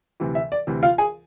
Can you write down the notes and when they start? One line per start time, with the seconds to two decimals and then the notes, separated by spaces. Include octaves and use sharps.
0.20 D2 C3 E3
0.35 E5
0.52 D5
0.67 D2 C3 E3
0.83 F4 F5
0.98 G#4 G#5